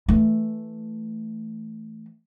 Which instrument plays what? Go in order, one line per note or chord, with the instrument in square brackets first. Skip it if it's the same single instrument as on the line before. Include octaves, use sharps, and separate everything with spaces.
[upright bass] E3 A3